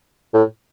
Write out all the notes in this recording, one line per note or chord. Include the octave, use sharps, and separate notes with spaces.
A2